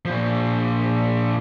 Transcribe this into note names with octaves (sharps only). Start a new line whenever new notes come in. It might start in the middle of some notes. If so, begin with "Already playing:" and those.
A#2 F3